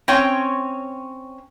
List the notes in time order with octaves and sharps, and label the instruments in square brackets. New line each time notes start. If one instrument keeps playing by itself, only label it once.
[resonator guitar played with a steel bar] C4 C#4 C#5 G5